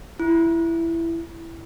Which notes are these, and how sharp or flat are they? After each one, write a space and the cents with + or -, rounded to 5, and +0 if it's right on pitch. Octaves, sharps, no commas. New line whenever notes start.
E4 +10